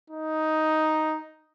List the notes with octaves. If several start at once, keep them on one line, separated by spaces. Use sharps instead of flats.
D#4